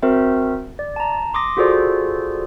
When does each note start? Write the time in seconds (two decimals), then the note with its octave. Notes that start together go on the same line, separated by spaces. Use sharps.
0.02 C4 F#4 A#4 C5 E5
0.79 D5
0.96 A5 A#5
1.34 C6 D6 D#6 A#6
1.57 F4 F#4 G#4 A4 C5 D5